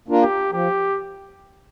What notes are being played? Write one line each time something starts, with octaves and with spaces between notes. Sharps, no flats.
A#3 D4 F4 A#4
G4
F3 G4